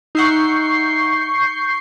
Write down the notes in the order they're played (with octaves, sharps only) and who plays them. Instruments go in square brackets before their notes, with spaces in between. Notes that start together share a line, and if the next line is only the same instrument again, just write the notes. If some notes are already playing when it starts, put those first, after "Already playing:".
[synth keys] D#4 E5 F#5 [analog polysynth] C#6 G6 C7